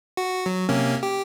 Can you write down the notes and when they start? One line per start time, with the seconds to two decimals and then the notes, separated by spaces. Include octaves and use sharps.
0.17 F#4
0.46 F#3
0.69 C3 A#3 C#4
1.03 G4